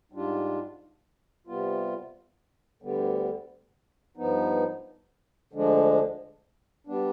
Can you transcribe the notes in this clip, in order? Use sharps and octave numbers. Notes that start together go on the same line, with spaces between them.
G#2 G3 D4 F4
C3 G3 B3 F4
D2 D3 G3 B3
G2 F3 B3 D#4
D2 D3 F3 G#3 D4
G3 B3 D4